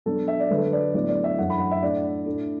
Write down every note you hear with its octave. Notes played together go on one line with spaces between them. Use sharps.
B2 F#3 D4 A4
E5
D5
D3 F#3 A3 B4
A4
B4
D5
A2 F#3 B3 D4 D5
D5
E5
F#2 E3 A3 D4 F#5
B5
F#5
E5
A2 A3 D4 D5
A2 A3 D4